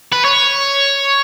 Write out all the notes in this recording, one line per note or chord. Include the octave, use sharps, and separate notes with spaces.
B4
C#5